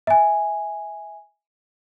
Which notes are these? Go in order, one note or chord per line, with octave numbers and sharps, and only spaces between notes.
E5 G#5